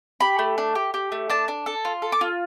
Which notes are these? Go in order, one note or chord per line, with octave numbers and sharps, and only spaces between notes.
G4 B5
A3
D4
G4
G4
A3
D4 A5
D4
A4
F4
A4
D6
F4